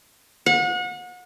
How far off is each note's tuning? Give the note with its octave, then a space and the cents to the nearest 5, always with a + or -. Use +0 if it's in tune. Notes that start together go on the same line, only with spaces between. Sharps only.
F#5 -35